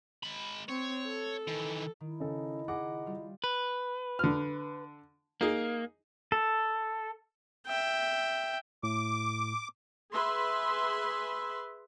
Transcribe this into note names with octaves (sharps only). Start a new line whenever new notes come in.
G#3 B5
C4 C#5
A4
D#3 E3
D#3 E4
C#3 D#4 A4
C#3 G#4 F#5 D6 A#6 C7
G3 F4
B4
D3 F6
A#3 D#4 G#4
A4
E5 G5
A2 D6
G#4 B4 E5 C6